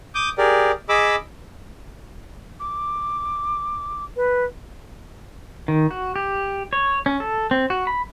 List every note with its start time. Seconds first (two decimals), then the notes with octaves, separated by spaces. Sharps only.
0.15 D6 D#6 G6
0.38 G4 G#4 A#4 D5
0.89 G#4 D#5 B5 D6 E6
2.59 D6
4.16 B4
5.68 D#3
5.91 F#4
6.16 G4
6.73 C#5
7.06 C#4
7.20 A4
7.51 C4
7.70 F#4
7.87 B5